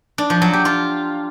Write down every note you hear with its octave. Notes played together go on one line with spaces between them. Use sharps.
D4
F3
F#3
G4
F4